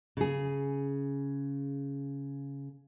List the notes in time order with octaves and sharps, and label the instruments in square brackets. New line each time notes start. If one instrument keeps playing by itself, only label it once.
[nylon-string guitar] C#3 G#4